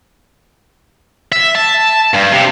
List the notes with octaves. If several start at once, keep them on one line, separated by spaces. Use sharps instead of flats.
E5
A5
G2
C3